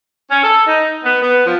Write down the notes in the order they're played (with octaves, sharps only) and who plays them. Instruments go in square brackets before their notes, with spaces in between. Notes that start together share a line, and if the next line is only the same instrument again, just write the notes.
[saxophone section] C#4
A4
D#4
B3
B3
F3